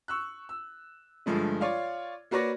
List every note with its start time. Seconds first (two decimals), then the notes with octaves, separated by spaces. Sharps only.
0.08 C#6 E6 F#6
0.49 E6
1.26 G2 D3 F3 G#3 A3
1.61 F4 C#5 D5 F5
2.31 A#3 F#4 B4 C#5 D5 A#6